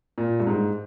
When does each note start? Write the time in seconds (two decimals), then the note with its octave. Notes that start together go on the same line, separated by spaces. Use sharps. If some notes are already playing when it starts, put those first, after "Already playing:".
0.18 A#2
0.40 G2
0.47 G#2